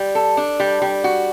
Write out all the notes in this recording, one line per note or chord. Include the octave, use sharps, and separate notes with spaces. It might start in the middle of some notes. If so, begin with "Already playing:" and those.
Already playing: G3
A4
D4
G3
G3
F#4